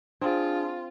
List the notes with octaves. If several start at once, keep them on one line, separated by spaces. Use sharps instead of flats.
C4 D4 F4 G#4